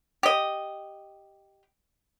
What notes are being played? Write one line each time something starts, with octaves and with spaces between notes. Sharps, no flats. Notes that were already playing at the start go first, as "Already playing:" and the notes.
G4 D#5